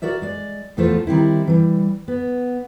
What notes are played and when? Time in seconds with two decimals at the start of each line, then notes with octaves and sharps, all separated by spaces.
0.02 F#4 A#4 D5 E5
0.22 G#3 D5
0.77 E2 A#2 F3 A3 F4 C5
1.07 D#3 G3 C4 E4
1.47 E3 G3
2.08 B3